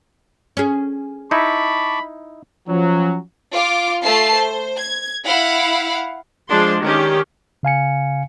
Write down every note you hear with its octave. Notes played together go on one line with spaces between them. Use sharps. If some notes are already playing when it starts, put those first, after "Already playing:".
C#4 G#4
D#4 E4 A5 B5 C#6 D6
F3 F#3 C#4
F4 D6
A3 F4 A5 C7
C5
G#6
E4 F5 F#5
F3 G#3 D4 C6
D#3 C#4 G4
C#3 F5 G#5 C#7